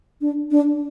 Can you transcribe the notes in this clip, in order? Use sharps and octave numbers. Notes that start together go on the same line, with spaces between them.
D4
D4